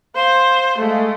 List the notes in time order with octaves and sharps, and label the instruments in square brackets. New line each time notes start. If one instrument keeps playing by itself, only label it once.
[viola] C5 [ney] F5
[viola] G#3 A3